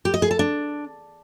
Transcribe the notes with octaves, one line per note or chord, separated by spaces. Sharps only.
G4
D#5
G#4
A4
D4